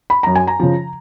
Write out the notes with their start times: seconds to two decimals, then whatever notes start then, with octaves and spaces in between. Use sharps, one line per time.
0.10 B5
0.23 F#2 A#5
0.35 G#5
0.47 A#5
0.60 C#3 F3